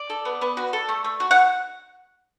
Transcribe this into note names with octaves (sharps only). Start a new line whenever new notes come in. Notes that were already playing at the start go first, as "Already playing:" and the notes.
Already playing: D5
A4
B3
B3
F#4
A4
A3
A3
F#4
F#5